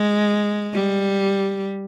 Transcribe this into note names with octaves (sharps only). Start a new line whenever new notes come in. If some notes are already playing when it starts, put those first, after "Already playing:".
Already playing: G#3
G3